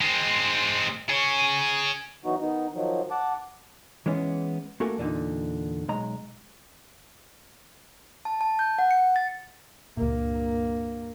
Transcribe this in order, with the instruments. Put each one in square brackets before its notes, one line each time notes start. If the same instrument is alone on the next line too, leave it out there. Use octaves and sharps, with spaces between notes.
[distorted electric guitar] G#3 C4
G#4 C#5
[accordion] E3 F#3 B3 D#4 F#4
D#3 B3 D#4
D#3 F3 F#3
F#5 A5 D6
[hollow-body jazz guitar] E3 G#3 B3 C#4
A3 A#3 F#4 A4 A#4 G#5
E2 A#2 D3 D#4
B1 G#3 A#5
[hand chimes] A5
A5
G6
F#5
C#7
A6
[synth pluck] C#2 A#2 [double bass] G2 A#3